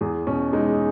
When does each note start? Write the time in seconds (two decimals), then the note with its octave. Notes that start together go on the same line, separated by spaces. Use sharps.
0.01 E2 G#4
0.27 B2 C#4
0.53 G#3 D#4